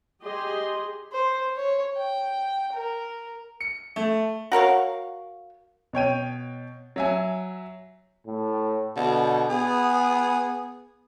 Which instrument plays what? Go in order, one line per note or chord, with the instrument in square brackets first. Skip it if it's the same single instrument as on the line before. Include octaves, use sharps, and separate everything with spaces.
[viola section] G4 G#4 D#5 C6
[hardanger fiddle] C5
C#5
G5
A#4
[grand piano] C#7
A3
[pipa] F#4 A#4 C#5 F5
[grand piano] B2 C#5 G5 D#7
F#3 E5 G#5
[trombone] A2
[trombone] B2 [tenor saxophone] D3
[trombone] B3 [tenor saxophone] G#4